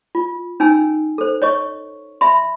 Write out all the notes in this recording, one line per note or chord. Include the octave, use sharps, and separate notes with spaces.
F4
C#4 D#4 G#5 E6
A4 C5
C#5 D#5 C#6
E5 B5 C6